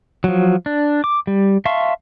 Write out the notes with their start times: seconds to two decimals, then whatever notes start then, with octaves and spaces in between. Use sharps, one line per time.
0.24 F3 F#3
0.66 D4
1.04 D6
1.27 G3
1.65 E5 F5 A5 C6 C#6